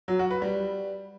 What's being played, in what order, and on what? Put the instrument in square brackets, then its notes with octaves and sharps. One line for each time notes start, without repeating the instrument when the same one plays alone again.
[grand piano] F#3
F#4
B4
G3